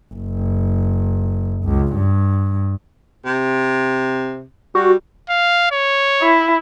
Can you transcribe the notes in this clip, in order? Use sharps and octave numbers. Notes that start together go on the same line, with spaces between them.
F#1
C#2
G2
C3
G3 F#4
F5
C#5
E4